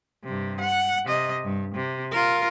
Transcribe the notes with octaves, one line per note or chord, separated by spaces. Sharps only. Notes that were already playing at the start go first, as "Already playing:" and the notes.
G2 C3
F#5
C3 D#5
G2
C3
F4 A#4